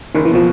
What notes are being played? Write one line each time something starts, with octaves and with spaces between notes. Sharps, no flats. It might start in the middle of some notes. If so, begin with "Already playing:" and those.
F#1 D#3
E3
B2 F3